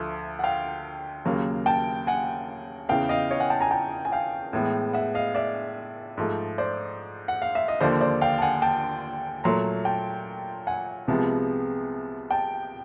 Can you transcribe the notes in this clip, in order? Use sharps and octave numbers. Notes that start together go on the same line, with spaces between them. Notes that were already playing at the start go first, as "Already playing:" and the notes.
Already playing: D2 D3 F3 A3
F#5
F5 G5
D#2 C#3 F#3 A#3
G5 A5
F#5 G#5
E2 C#3 E3 F5 G5
D#5 F5
C#5 D#5
F#5 G#5
G5 A5
G#5 A#5
G5 A5
G#5
F5 G5
A2 E3 G#3 B3
E5 F#5
D#5 F5
D5 E5
G#2 F3 A3
C5 D5
F#5
F5
E5
D#5
D#2 D3 F3 A#3 C5 D5
C5 D5
F5 G5
A5
F#5 G#5
G5 A5
A#2 F#3 A3 A#5 C6
G5 A5
F#5 G#5
C2 C3 F3 G#3 B3
G5 A5